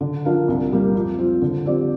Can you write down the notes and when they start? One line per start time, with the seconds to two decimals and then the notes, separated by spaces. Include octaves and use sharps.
0.01 D3
0.25 F3 D4 A#4 F5
0.48 C2
0.72 A#2 G3 A#3 G4
0.95 F2
1.18 F3 C4 F4
1.42 D3
1.65 F3 C4 G4 D5